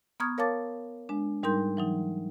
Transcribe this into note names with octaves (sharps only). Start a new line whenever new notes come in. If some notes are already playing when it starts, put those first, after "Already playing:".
B3 A#5 C#6 D#6 F6 G#6
A#4 C#5 F5 A5 D6 A6
G#3 D4
G#2 G3 D#4 A#4 C6 G6
E3 F#3 D#4